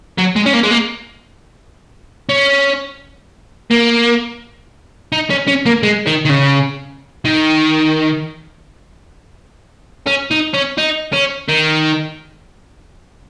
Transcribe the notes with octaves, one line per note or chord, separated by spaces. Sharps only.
F#3
G#3
C#4
A#3
G#3
A#3
C#4
A#3
D#4
C#4
C#4
A#3
G#3
D#3
D#3
C#3
D#3
C#4
D#4
C#4
D#4
C#4
D#3